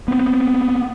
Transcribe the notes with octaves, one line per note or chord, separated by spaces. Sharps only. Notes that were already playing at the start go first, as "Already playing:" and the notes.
B3 C4